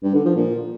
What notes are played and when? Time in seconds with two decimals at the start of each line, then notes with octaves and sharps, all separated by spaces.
0.03 G2
0.14 D3
0.25 F3
0.36 A#2